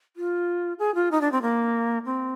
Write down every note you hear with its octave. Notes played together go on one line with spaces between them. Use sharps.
F4
G#4
F4
D#4
D4
C4
A#3
C4